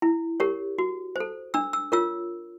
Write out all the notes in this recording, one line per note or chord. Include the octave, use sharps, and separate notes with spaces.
E4
G4 A#4 C#5
F#4
A4 C5
D4 E6
E6
F4 A#4 C#5 E6